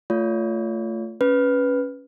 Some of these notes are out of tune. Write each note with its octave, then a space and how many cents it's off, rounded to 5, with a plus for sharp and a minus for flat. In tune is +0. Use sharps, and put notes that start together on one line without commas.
A3 +15 F4 -5 C#5 +40
C#4 +0 B4 +0